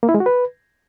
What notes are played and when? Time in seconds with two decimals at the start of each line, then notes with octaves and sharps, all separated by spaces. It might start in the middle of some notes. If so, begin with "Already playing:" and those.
0.03 A#3
0.09 E4
0.14 G#3
0.20 F#4
0.26 B4